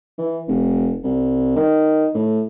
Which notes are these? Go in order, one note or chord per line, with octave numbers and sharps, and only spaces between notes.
E3
F1
C2
D#3
A2